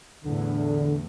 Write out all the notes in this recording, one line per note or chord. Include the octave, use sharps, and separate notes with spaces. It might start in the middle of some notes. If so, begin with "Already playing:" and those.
E2 A2 D3